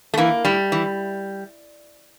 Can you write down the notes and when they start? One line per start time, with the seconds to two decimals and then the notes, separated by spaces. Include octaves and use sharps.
0.14 A3
0.17 E3 A#3
0.45 A2 G3
0.72 E3